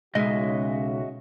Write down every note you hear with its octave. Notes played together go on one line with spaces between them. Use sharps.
B1 C#3 G#3 F#4 D#5 E5